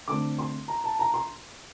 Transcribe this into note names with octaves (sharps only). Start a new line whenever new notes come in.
D3 A3 C4 D6
C6
A#5
A5
A#5
C6